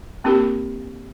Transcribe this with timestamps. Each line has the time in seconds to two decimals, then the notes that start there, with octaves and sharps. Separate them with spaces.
0.24 A#3 C4 D4 F#4 G4 A#4